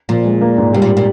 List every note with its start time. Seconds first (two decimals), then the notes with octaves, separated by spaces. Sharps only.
0.09 A#2 F3
0.25 G#3
0.41 A#3
0.58 G#2
0.73 C3 G3
0.82 A#2
0.97 A#2